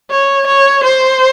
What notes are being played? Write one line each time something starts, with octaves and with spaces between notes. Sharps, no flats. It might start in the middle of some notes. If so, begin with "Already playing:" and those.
C#5
C#5
C5